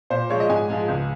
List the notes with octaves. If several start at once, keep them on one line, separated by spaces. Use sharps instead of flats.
A#2 C5
F3 G#3 C#5
D#5
G#2 G#5
F3 G#3
C#2